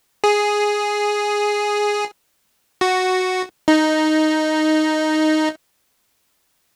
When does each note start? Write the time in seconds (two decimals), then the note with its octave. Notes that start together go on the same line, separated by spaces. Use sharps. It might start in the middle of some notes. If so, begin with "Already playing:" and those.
0.24 G#4
2.81 F#4
3.68 D#4